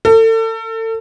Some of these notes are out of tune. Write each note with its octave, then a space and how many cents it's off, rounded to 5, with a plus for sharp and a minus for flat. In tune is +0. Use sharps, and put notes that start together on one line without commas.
A4 +35